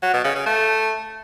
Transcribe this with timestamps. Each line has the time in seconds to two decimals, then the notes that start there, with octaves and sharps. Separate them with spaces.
0.03 F#3
0.14 B2
0.24 C#3
0.35 C#3
0.46 A3